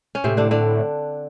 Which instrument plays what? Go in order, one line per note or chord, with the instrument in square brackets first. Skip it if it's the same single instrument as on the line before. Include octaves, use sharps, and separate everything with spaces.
[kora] C#4
[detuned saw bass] A2 [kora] C3 C4
[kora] D3 D4
D3 D4